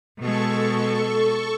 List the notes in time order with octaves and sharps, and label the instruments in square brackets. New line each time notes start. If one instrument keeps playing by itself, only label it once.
[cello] B2 G#3 [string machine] A4 C#6